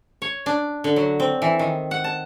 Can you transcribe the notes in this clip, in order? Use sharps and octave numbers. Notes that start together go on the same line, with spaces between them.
C#5
D4
D3
F#3
C4
E3
D#3
F#5
A5